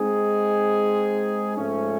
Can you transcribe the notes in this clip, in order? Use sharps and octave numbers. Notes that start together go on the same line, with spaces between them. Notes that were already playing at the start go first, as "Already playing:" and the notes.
Already playing: G#3 C4 D#4 G#4
G#2 F3 A3 C#4